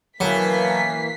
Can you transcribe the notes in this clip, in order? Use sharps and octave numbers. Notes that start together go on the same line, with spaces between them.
B2 E3 F#3 A#3 C#4 B4 B6 C7